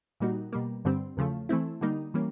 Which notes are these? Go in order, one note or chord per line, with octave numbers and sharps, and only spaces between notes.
A#2 G3 A#3 D#4 F#4
B2 G3 A#3
G2 D3 G3 C4
E2 C#3 F3 A3
E3 A3 C4 E4
D3 G3 A#3 D#4
E3 G3 A#3 C#4